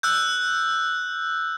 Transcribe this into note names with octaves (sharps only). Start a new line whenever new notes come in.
E6 F#6 G6